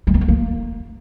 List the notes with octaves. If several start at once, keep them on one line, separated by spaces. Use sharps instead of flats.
G#3
B3
A3
A#3